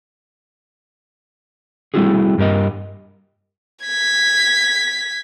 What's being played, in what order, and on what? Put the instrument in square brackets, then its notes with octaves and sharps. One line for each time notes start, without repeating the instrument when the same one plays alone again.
[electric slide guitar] G3 A3 C4 E4 F#4 G#4
G2 G4 A#4 D#5
[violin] G#6 B6